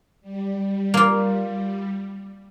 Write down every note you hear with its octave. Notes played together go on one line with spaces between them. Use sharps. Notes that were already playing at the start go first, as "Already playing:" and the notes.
G3
A#3 F4